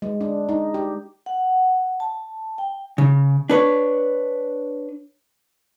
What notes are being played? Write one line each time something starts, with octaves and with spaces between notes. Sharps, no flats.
G#3
D4
D#4
G4
F#5
A5
G5
C#3
D4 B4 C#5